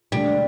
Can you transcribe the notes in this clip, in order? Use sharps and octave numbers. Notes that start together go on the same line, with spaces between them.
E1 D2 D3 G3 A3 D4